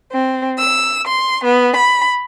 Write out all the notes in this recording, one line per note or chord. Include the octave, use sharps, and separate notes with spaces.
C4
E6
C6
B3
B5